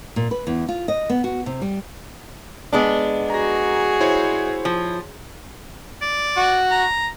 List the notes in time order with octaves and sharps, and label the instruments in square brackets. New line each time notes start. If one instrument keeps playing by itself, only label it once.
[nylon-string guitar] A#2
B4
E2
F4
D#5
B3
F#4
C3
G3
[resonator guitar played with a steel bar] G#3 B3 D4
[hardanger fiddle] F#4 G#4 [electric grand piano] A#5 A#6
[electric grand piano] E4 C5 C#5
[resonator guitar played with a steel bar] F3
[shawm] D5
[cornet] F#4
[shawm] A#5